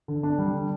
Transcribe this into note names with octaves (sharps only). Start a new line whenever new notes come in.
D3
D4
G3
D3